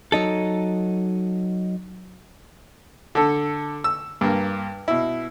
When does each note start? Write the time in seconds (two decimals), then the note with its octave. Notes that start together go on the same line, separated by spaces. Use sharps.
0.12 F#3 D#4 A4
3.15 D3 A4
3.84 E6
4.21 G2 A#3
4.88 B2 E4